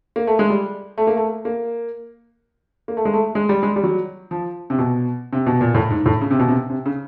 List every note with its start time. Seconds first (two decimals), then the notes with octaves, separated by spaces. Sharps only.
0.16 A#3
0.27 A3
0.39 G#3
0.50 G3
0.98 A3
1.07 A#3
1.17 A3
1.45 A#3
2.88 A#3
2.97 A3
3.05 G#3
3.14 A3
3.35 G#3
3.49 G3
3.63 G#3
3.76 G3
3.83 F#3
4.31 F3
4.70 C3
4.78 B2
5.33 C3
5.46 B2
5.61 A#2
5.74 A2
5.90 G#2
6.06 A2
6.21 C#3
6.31 C3
6.40 B2
6.48 C3
6.70 C3
6.86 C#3